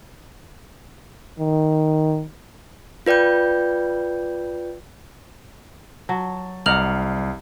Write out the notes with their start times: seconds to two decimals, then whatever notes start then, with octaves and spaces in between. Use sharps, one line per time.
1.40 D#3
3.06 F4 B4 D5 G5 G6
6.09 F#3 A5
6.66 C2 D#4 D5 F#5 F6 F7 F#7